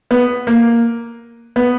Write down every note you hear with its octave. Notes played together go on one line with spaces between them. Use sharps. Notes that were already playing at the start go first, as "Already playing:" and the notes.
B3
A#3
B3